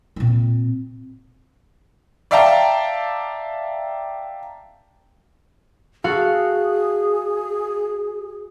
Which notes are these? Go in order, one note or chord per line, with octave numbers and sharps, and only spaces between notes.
A#2 C4
D5 E5 F5 G5 A5 A#5
F#4 G#4 A4 F5